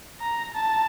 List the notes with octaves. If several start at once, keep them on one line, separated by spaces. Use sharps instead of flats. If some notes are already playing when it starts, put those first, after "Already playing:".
A#5
A5